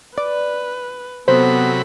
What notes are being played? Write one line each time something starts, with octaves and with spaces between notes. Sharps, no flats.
B4 D5
C3 F#3 B3 A4 C5 B5